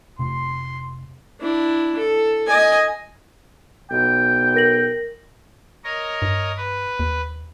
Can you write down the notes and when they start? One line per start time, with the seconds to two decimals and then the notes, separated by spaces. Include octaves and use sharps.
0.19 F1 C3 C6
1.41 D4 E4
1.98 A4
2.47 D#5 G#5
3.91 B1 G5
4.55 A#4 A#6 F#7
5.84 A#4 C#5 D#5
6.22 G2
6.57 B4
7.00 D#2